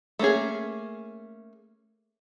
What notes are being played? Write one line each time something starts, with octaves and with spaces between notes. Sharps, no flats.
A3 A#3 C#4 G#4